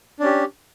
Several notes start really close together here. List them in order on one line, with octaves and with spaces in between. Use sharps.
D4 C#4 G4